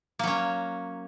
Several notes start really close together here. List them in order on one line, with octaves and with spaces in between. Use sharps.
A#3 F#3 C#4